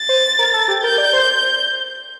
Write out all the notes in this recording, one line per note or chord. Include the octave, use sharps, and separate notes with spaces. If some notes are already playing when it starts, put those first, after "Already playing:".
Already playing: A6
C5
A#4
A4
G4
A#4 G6
D5
C5